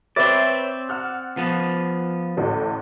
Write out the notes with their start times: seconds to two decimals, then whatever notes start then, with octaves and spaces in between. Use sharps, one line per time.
0.16 C4 B4 C#5 D5 E5
0.89 F#5 F6 F#6
1.37 F3 B3
2.37 A1 D2 A2